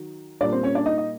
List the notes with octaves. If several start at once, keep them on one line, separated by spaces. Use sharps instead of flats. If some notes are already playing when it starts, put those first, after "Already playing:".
Already playing: D#3 F#3
A#2 G3 A#3 D4 D5
C4 C5
C#4 C#5
D4 D5
D#4 D#5
D#5